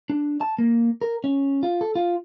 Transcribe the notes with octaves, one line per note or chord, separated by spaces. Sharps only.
D4
A5
A#3
A#4
C#4
F4
A4
F4